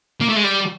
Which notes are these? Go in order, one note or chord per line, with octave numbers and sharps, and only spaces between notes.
A#3
A3
G#3
G3